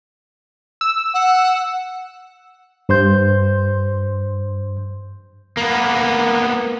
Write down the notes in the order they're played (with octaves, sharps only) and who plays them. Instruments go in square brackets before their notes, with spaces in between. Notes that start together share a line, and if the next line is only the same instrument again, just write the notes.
[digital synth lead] E6
[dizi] F#5
[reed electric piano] G2 C5 C6 G6
[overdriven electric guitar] A#3 B3